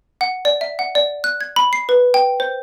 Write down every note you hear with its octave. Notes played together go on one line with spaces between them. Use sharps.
F#5
D5
E5
F#5
D5
F#6
G#6
B5
C7
B4
G5
C5